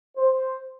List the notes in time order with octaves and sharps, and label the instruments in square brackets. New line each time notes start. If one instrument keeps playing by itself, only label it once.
[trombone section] C5